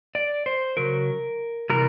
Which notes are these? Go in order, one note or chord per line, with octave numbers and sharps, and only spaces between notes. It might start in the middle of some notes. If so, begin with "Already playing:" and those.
D5
C5
C#3 F#3 A#4
C3 E3 G3 A#4